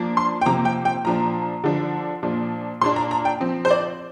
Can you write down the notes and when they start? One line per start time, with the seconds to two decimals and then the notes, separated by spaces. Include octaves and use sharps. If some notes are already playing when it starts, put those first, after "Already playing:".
Already playing: F3 A#3 D4
0.17 C6
0.41 G5
0.46 C3 F3 A#3 A#5
0.65 G5
0.85 G5
1.05 A#2 F3 D4 A#5
1.64 D3 F3 D4
2.23 A#2 F3 D4
2.81 A#2 A#3 D4 C6
2.96 A#5
3.11 A#5
3.25 G5
3.40 F3 C4
3.65 C5
3.71 D5